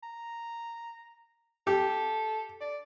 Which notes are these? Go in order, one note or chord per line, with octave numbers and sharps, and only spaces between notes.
A#5
G4 A4
D5